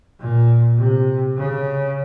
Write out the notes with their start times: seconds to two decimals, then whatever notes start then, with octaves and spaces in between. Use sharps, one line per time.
0.20 A#2
0.78 C3
1.37 C#3